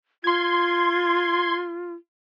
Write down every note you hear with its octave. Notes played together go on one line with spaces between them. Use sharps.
F4 C6 G#6